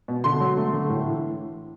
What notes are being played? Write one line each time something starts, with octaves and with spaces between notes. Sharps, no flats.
B2
D3 C6
F#3
A3
D3
A2
E3